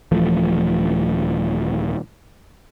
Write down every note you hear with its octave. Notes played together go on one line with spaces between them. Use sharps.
D#1 E3 F3 A3